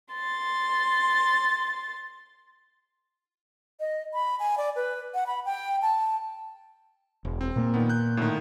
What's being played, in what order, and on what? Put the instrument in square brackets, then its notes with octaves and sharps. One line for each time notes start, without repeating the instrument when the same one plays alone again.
[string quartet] C6 A6
[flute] D#5
B5
G#5
D5
B4
F#5
B5
G5
A5
[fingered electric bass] E1
[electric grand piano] C4
[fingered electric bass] A#2 A#3
[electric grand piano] D#3 B3
F#6 G6
A2 D3 D#3